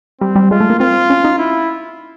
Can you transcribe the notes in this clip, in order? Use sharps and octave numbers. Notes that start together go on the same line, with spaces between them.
G3 C4
G3
G#3 F4
A3
A#3
C4 F4
C#4
D#4
E4